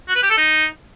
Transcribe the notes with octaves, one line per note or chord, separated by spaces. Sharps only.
F#4
B4
G4
A4
D#4